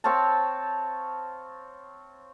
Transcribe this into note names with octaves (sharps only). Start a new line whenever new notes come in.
C4 C#5 F5 A5